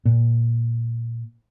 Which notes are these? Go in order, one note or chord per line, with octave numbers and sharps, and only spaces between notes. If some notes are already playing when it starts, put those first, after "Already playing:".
A#2